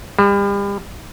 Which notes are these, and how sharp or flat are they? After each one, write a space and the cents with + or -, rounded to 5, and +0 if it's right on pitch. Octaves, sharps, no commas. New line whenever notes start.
G3 +35